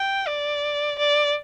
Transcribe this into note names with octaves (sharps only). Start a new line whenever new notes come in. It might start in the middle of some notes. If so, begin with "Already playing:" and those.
Already playing: G5
D5
D5